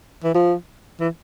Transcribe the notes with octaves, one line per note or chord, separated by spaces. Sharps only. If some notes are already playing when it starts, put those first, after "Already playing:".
E3
F3
E3